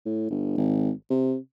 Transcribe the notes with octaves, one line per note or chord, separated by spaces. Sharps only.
A2
G1
G#1
C3